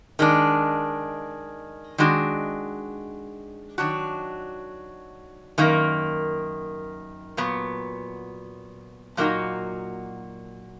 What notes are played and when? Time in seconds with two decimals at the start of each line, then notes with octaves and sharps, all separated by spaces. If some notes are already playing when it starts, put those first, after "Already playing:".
0.19 D#3 G#3 D4
1.98 D#3 G#3 D4 F#4
3.78 D#3 F#3 D4 F#4
5.58 F#2 D#3 A#3
7.37 A#2 F#3 B3
9.17 A#2 F#3 A#3 D#4 F#4